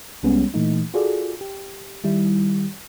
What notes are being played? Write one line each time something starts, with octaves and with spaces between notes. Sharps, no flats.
C2 G3 G#3 B3 C#4
A#2 E3 A3 D#4
F4 F#4 G#4 A4 D5
G4
D#3 G3 E4